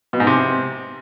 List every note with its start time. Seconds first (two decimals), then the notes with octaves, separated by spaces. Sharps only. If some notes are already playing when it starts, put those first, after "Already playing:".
0.13 B2
0.20 G#2
0.27 C3